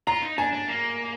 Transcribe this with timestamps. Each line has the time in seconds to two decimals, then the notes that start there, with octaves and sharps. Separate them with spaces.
0.07 F4 A#5
0.23 D#4
0.38 D4 G#5
0.53 D4
0.68 A#3